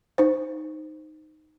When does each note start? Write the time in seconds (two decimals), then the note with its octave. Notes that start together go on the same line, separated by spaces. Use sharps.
0.18 D#4 C5